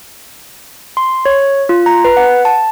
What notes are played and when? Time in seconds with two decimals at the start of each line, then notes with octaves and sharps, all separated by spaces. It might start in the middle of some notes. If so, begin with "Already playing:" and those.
0.97 C6
1.25 C#5
1.69 F4
1.86 A#5
2.05 B4
2.17 F#5
2.45 A5